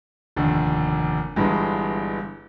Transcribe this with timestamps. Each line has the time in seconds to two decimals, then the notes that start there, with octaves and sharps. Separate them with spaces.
0.36 F1 D#2 D3
1.36 G1 G2 E3 G#3